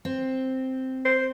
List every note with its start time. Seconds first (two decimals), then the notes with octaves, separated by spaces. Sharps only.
0.05 C4
1.05 C5